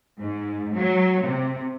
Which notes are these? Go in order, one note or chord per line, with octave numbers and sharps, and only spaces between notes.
G#2
F#3
C3